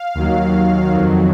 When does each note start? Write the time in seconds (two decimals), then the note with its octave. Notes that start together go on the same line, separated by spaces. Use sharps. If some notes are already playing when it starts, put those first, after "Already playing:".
Already playing: F5
0.15 D#2 D#3 F#3
0.90 F2 D#3 F#3